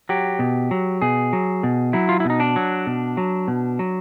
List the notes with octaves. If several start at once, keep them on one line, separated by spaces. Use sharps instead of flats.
F#3 G4
B2
F#3
B2 G#4
F#3
B2
F#3 E4
F4
E4
B2 D#4
D4
F#3
B2
F#3
B2
F#3